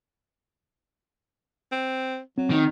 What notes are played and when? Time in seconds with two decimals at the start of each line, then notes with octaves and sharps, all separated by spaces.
1.72 C4
2.38 F#3 C4
2.50 D#3